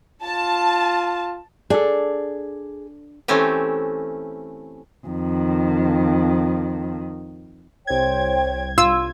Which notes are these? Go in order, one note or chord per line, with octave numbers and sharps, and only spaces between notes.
F4 A5
D4 G#4 A4
E3 A3 C4 C#4 G4
F2 D#3
C2 C5 C#5 G5 G#6
F4 E6